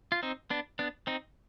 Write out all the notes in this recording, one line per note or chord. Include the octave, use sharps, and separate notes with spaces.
F4
C4 D#4
B3 D4
B3 D4
C4 D#4